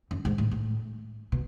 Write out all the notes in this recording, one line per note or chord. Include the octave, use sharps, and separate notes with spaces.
F#2
G#2
A2
A2
B2